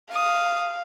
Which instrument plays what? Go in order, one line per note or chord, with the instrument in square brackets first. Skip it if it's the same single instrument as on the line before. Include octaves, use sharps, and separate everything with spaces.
[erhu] F5 [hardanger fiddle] D#6